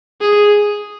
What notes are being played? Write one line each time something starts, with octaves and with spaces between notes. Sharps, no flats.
G#4